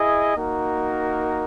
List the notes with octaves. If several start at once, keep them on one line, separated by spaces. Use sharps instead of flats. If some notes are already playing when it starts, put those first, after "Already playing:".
Already playing: E4 G#4 D#5
A#3 D#4 F#4 A#4